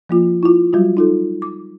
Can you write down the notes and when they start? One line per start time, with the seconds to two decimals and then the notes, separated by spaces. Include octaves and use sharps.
0.09 F3 A#3 F4
0.43 E4 F4
0.73 F#3 G3 F4 F#4
0.97 D#4 F4 A4
1.42 D6